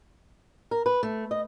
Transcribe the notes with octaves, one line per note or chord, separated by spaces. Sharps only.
A#4
B4
A3
D#5